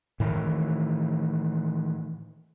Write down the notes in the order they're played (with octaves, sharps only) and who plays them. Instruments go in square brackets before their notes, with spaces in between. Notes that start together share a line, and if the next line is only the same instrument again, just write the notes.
[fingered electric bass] A2 D#3 E3